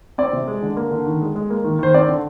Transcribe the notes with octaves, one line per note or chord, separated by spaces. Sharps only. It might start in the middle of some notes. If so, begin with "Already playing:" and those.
C4 D5
C3
G#3
D3
A#3
D3
D#3
G#3
G#3
A#3
D#3
D#3 C5
C4 D5
D3